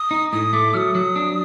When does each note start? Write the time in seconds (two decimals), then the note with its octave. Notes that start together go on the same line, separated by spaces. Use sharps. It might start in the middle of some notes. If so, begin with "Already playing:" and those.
Already playing: D#6
0.11 D#4
0.32 A2 D#6
0.53 A3 D6
0.74 F#3 D#6 F6
0.95 F#3
1.16 D4